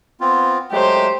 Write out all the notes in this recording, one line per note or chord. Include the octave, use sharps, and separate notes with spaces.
B3 C4 F4
F#3 G#3 A3 G4 C5